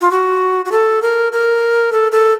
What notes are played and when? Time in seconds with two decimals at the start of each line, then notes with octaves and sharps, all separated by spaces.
0.01 F4
0.11 F#4
0.65 F#4
0.72 A4
1.02 A#4
1.32 A#4
1.92 A4
2.12 A4